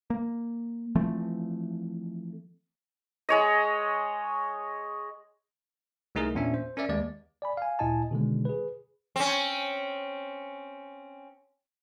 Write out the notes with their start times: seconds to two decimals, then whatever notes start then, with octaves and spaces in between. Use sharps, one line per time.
0.10 A#3
0.95 E3 F3 A3 C4
3.29 G#3 C#5 D#5
6.15 C2 A3 D#4 G#4 A#4
6.35 E2 A#2 C#4 D4 E5
6.54 C5
6.77 C#4 A#4 D5 E5
6.89 D#2 G#3 D5
7.42 D5 G#5 B5
7.57 F5 G#5
7.79 D2 A#2 E4 D#5 G#5 A5
8.11 B2 D3 D#3 G#3
8.45 G#4 B4
9.16 C4 C#4